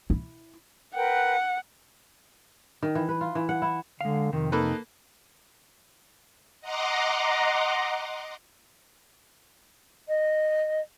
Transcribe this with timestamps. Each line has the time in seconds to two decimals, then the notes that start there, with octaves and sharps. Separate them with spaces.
0.10 E4
0.95 A#4 B4 F#5 G5
2.82 D#3
2.95 E3
3.09 B4
3.21 F4
3.35 E3
3.49 F#5
3.62 E4
4.01 D3 G#3 F5
4.33 F2 C3 D#3
4.52 A#3 D#4 A4 B4
6.61 D#5 F#5 A#5 C6 D6
10.07 D#5